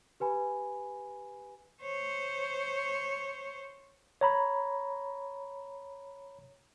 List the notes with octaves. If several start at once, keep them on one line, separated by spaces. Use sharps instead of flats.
G4 B4 G#5 B5
C5 C#5
C#5 A#5 B5